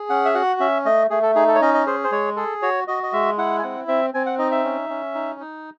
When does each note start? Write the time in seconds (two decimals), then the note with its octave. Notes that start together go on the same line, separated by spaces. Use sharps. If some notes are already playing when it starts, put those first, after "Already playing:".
Already playing: G#4
0.09 C#4 F#5
0.25 E5
0.34 F#4 F#5
0.60 C#4 E5
0.85 A3 D#5
1.10 A3 G#4
1.23 A4
1.35 D#4 G#4
1.48 A4
1.55 C#5
1.62 C#4 D#5
1.74 D#5
1.86 G#4 C5
2.04 C5
2.11 G#3 C#5
2.36 G#4 A4
2.62 F#4 C#5
2.88 F#4 D#5
3.03 D#5
3.13 G#3 E5
3.38 E4 F#5
3.59 G#5
3.63 C4 F#5
3.88 C4 E5
4.14 C4 G#5
4.26 F#5
4.38 D#4 D#5
4.51 E5
4.64 C#4
4.90 C#4
5.15 D#4
5.40 D#4